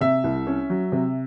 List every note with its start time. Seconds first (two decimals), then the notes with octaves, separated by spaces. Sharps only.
0.01 C3 E5
0.24 C2
0.47 C#4
0.70 F#3
0.92 C3